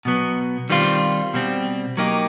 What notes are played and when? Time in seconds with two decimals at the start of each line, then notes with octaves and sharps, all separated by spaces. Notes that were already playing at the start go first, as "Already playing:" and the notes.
0.05 B2 F#3 B3
0.70 D#3 G3 C4 F4
1.34 B2 G3 C4
1.97 F#3 A#3 D#4 G4